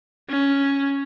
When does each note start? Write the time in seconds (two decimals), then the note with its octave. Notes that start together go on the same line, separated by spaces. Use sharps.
0.29 C#4